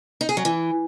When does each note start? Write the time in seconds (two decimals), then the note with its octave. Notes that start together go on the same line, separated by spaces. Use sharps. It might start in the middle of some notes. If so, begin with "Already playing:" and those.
0.21 D#4
0.29 G#4
0.37 F#3
0.45 E3